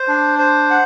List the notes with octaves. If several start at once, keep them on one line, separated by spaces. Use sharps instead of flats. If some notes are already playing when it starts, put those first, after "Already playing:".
Already playing: C5
D4
C5
F#5